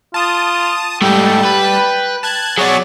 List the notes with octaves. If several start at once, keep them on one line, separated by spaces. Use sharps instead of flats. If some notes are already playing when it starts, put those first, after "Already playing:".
F4 A5 D#6
G#2 G3 A3 G5 A5
B4
A5 F#6 G#6
F#3 B3 G#4 C#5 D5